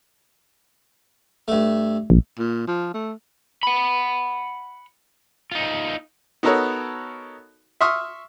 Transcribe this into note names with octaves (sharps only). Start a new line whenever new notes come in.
G2 A3
A#1
A#2
F3
A3
F#5 B5
D#4 F4
B3 D#4 F#4 A4 A#4 C#5
E5 C6 C#6 D#6 F6